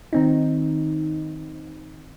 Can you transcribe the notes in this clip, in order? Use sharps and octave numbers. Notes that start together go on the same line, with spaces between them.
D#3 C4 D#4